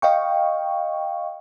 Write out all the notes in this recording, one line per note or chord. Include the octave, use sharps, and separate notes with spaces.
D#5 F5 G5 C#6